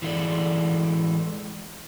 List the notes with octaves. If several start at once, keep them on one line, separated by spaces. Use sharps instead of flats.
E3 G#3 F4 A4 D5